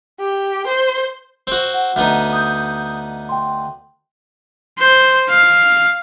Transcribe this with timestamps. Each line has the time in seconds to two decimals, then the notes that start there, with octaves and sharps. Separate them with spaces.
0.19 G4
0.67 C5
1.47 C4 F#4
1.74 F#5
1.96 D2 B3 D#4
2.32 D#6 G6
3.29 G5 C6
4.79 C5
5.30 F5